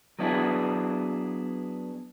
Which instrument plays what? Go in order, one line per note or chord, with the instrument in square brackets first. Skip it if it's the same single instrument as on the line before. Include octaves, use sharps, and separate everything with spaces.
[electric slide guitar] F#3 B3 D4 E4 F#4 G#4